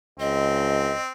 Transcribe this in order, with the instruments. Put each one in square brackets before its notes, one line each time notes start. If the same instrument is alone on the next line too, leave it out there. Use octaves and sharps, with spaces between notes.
[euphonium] C#2 [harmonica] C4 [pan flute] D#5